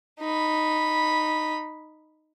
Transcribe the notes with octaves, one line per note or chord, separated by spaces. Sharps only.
D#4 B5